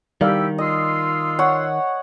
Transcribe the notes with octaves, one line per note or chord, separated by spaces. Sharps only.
D#3 G3 E4 G4 D5 F5 E6
F4 D#5 C6 E6
C#5 F#5